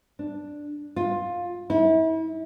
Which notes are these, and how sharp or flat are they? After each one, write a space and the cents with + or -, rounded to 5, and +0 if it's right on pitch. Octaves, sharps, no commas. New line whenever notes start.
D4 +0
F4 +15
E4 -35